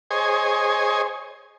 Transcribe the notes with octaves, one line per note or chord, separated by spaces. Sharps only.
G#4 C5 C#5 D#5 G#5